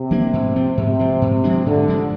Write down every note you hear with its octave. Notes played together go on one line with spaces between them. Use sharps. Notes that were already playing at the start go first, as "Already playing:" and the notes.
Already playing: C3
F3 A#3 D4
G#2
F3 C4
G#2 C3
F3 C4
G#2
F3 G#3 D4
G#2 D3
F3 G#3 D4